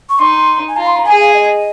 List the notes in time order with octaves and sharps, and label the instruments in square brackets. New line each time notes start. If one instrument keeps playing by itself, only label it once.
[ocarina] C#6
[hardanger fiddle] D#4 [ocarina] C6
[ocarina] G#5
[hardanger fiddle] F4 [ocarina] A#5
[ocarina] C6
A#5
[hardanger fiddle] G#4 [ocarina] G#5
[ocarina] F5
D#5